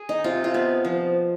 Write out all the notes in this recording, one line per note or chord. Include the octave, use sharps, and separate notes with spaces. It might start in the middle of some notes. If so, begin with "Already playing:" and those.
Already playing: G#4
D#4
C3 F4
F4
B3
F3